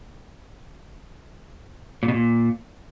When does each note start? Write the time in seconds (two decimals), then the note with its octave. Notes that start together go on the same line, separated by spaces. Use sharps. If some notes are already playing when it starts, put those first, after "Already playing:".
2.03 A#2
2.08 B2
2.14 A#2